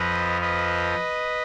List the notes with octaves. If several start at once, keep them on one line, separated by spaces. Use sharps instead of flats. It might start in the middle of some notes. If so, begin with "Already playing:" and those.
Already playing: F2 F3 B4 D#5
B4 D#5